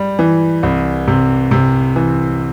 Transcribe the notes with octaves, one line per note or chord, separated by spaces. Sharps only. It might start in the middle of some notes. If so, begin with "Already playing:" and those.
Already playing: G3
E3
C2
C3
C3
E3